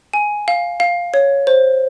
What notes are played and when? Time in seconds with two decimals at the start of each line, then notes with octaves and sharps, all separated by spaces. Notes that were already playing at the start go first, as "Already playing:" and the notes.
0.13 G#5
0.48 F5
0.80 F5
1.14 C#5
1.47 C5